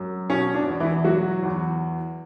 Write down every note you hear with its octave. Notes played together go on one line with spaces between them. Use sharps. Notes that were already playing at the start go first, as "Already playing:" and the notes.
Already playing: F#2
B2 C#4
D4
E2
E3 E4
F#3 F#4
E2